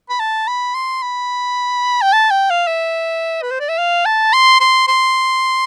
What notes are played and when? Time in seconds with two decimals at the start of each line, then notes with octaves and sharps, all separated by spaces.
0.09 B5
0.19 A5
0.47 B5
0.74 C6
1.02 B5
2.02 G5
2.13 A5
2.31 G5
2.50 F5
2.67 E5
3.42 B4
3.51 C5
3.60 D5
3.69 E5
3.78 F5
4.06 A5
4.33 C6
4.60 C6
4.88 C6